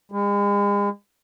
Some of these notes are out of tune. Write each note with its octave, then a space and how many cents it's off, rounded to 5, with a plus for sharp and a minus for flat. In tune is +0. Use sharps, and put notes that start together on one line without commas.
G#3 -40